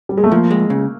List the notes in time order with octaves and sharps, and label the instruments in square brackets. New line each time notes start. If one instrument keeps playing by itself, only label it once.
[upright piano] G3
G#3
A3
[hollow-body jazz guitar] F3 [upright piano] A#3
[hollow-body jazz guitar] G#3
C#3